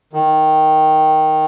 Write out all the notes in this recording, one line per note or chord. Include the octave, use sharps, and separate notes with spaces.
D#3